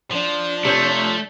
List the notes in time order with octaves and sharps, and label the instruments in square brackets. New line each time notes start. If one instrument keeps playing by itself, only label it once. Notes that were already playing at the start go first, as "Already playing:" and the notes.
[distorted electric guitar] F3 [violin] D4
[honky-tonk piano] C3 C#5 G6 [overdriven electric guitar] A3